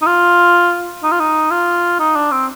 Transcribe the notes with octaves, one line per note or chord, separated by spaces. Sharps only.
D#4
F4
D#4
F4
D#4
F4
D#4
D4
C4